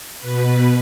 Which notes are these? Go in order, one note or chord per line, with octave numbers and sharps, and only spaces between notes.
B2 B4